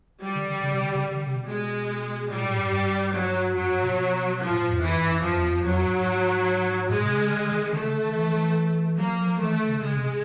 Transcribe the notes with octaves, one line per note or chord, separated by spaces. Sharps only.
G3
D3
D3
C#3
C3
D3
C#3
D3
D3
C3
B2
G#3
A#2 G3
A2
G2
G2
F#3
F#2 F#3
G2
B2
F3
A2
A2
E2
F2 E3
G2
F#2
F#2 F3
E2
F2
F2 F#3
G#2
A2 G#3
C3
C#3
D3
D#3
D3 A3
C#3
D3
D#3
E3
E3
F#3 A#3
F3
F3
E3 A3
D#3
C#3
C#3 G#3
C3